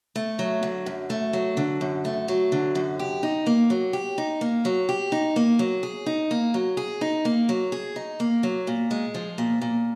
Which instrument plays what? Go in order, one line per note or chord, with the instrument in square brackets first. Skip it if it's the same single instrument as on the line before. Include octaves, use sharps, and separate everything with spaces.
[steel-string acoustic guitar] A3
F#3
D3
F#2
A3
F#3
D3
F#2
A3
F#3
D3
F#2
G4
D#4
A#3
F#3
G4
D#4
A#3
F#3
G4
D#4
A#3
F#3
G#4
D#4
A#3
F#3
G#4
D#4
A#3
F#3
G#4
D#4
A#3
F#3
A#2
G#3
F3
A#2
A#2